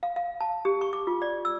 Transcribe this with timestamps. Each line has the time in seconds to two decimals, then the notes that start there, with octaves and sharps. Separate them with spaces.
0.03 F5
0.16 F5
0.41 A5
0.65 G4
0.81 C#6
0.93 D6
1.07 F4
1.22 D5
1.45 E6